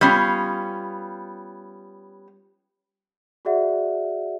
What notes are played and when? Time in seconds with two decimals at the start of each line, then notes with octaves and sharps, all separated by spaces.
0.01 G3 B3 C#4 F4
3.45 F#4 G#4 D5 E5 F#5